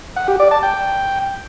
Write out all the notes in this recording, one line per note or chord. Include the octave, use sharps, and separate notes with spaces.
F#5
G4
D5
A5
G5